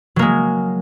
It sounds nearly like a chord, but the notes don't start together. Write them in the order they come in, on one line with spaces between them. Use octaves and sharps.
F#3 A#3 G#3